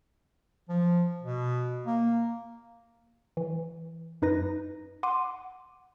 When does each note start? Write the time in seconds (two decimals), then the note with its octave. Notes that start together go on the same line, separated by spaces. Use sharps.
0.69 F3
1.22 B2
1.86 A#3
3.37 E3
4.22 F#2 D#4 B4 A#6
5.03 F#5 C6 D6 D#7